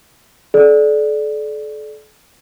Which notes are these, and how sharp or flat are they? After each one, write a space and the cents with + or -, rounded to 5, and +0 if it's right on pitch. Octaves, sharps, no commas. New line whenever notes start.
A4 -40 D5 +0